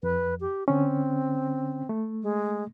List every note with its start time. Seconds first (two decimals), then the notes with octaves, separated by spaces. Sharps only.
0.03 F2 B4
0.41 G4
0.68 D3 C4 C#4
1.89 A3
2.23 G#3